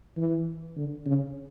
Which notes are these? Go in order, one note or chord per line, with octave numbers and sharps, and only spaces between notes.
E3
D3
C#3